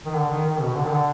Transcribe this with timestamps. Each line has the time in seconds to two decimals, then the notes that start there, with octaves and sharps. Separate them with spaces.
0.06 D#3
0.16 D3
0.30 D#3
0.45 D#3
0.62 B2
0.76 D3
0.85 D#3
0.91 D3